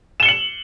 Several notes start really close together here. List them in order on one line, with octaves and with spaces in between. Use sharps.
E7 G7 C#7 F#7